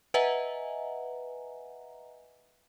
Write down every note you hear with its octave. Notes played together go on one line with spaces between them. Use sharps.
B4 D#5 E5 F#5 G#5 A#5